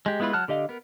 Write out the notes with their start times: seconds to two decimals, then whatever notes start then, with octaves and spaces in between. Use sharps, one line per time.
0.06 G#3 G4
0.20 G#3 B3 E4 F4 B4
0.33 F#3 F#5 A5 F6 F#6
0.48 D3 G4 D#5 F5
0.69 B3 A#4